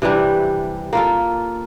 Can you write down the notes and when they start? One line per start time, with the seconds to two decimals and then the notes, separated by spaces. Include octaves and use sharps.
0.02 C3 E3 G3 D4
0.93 A#3 F4 A4